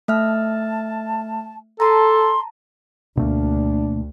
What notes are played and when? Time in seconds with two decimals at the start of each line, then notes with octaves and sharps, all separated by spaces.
0.08 A3 E5 A5 F6
1.80 A4 A5 A#5 C6
3.17 D2 B2 A3 A#3 D4